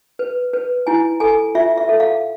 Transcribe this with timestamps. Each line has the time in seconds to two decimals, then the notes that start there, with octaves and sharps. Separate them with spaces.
0.19 B4
0.53 B4
0.87 E4 G#5
1.20 A4 G#5
1.55 F4 E5
1.77 E5
1.89 A4
2.00 F5